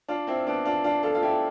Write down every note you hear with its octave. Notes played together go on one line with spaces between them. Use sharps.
D4 F4
C4 E4
B3 D4
D4 F4
D4 F4
F4 A4
F4
E4 G4